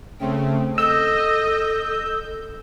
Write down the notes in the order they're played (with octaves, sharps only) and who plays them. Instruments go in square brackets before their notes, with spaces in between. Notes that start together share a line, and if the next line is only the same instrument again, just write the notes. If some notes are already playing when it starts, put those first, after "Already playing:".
[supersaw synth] C#3 A3 C4 [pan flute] G5
[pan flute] A4 [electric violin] D#5 [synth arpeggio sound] E6 [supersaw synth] G6